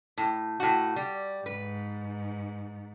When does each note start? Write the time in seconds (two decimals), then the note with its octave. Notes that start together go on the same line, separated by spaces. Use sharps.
0.18 A2
0.60 A2 F#4
0.96 G3
1.46 G#2 B4